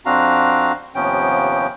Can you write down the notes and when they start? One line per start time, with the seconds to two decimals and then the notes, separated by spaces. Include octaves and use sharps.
0.06 F2 C4 D4 F#4 F5 A#5
0.95 D#2 C3 F3 B3 C#4 G5